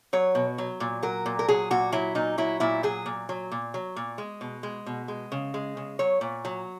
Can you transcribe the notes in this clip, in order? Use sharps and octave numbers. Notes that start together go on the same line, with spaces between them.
F#3 C#5
B2
F#3
A#2
F#3 A#4
A#2
A#4
F#3 G#4
A#2 F#4
F#3 E4
A#2 D#4
F#3 E4
A#2 E4
F#3 G#4
A#2
F#3
A#2
F#3
A#2
G#3
B2
G#3
B2
G#3
C#3
G#3
C#3
F#3 C#5
A#2
F#3